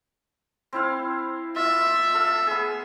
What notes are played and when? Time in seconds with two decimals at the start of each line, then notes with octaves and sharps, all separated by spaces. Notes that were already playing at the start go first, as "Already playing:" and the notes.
0.73 C4 E4 F5
1.56 F4 E5
2.14 A4 F5
2.47 B3 G#4